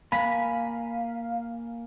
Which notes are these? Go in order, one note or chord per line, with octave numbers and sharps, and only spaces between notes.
A#3 F5 G#5 A#5 B5